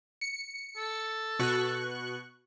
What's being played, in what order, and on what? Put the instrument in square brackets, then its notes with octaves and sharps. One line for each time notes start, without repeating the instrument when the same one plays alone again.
[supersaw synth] C#7
[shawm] A4
[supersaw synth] B2 C#6 F#6